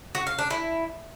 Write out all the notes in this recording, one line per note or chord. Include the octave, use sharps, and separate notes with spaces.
F#4
F5
D4
E4